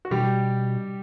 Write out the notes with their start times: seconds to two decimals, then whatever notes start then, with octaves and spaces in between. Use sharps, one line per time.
0.05 F#4
0.11 B2 G3 G4